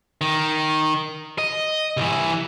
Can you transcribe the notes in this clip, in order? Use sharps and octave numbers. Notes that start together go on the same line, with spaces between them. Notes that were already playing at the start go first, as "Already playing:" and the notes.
D#3
D#5
C2 E3